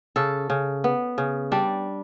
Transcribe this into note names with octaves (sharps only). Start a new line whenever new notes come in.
C#3 A4
C#3
B3
C#3
G3 D4